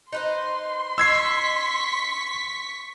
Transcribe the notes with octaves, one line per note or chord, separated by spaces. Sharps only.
D#4 B4 C5 C6
D#4 C#6 E6 G#6 B6 C7